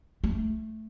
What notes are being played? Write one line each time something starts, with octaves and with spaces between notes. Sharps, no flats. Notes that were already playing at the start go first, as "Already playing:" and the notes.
A3